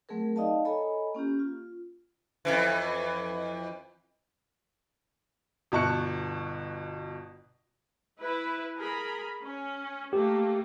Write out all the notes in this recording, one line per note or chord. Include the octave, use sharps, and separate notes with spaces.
F#3 A3 C4 G#4 A#4
D#4 D5 D#5 F5 A5
A4 C#5 D#5 G#5 A#5 B5
A#3 C#4 F4 G4
F4
F2 G#2 E3
G1 B2 A5 C#6 F#6 C#7
E4 B4
G#4 A#4 B5
C#4
A3 A#3 G4